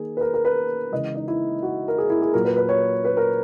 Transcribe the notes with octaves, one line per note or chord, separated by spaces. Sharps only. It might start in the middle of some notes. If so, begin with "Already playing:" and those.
Already playing: D#3 A#3 G#4
B4
A#4
A#4
B4
C#3 E3 G#3 D#5
D#4
E4
F#4
A#4
G#4
E4
G#4
A#2 F#3 A#3 A#4
B4
B4
C#5
B4
A#4